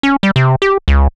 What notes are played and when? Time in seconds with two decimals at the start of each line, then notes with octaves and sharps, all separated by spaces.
0.03 C#4
0.23 G3
0.36 C3
0.62 G4
0.88 C#2